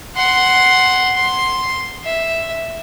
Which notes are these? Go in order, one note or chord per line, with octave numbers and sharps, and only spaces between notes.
F#5 C6
C6
E5